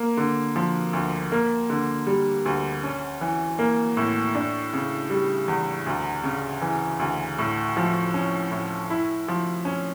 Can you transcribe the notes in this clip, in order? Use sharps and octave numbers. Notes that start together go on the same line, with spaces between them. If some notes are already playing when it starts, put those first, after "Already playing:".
Already playing: A#3
D3
F3
D2
A#3
D3
G3
D2
C#4
E3
A#3
A2
D4
C#3
G3
E2
D2
C#3
E3
D2
A2
F3
C#4
A2
E4
F3
C#4